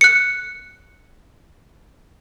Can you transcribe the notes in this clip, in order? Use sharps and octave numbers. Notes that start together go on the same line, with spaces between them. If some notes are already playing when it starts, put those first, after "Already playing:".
F#6 C#7